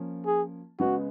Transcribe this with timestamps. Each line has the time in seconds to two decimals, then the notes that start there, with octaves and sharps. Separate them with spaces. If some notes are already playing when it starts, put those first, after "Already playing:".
Already playing: F3 A#3 C#4
0.26 G#4
0.80 C#3 G#3 B3 F#4